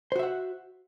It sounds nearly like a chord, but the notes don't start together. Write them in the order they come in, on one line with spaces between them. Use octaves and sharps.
C5 F#4 E5 F#5